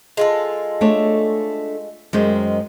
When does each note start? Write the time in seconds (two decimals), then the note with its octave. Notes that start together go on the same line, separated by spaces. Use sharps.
0.17 G#3 F4 A4
0.81 A3 D4 C#5
2.13 F#2 D#3 G#3 C5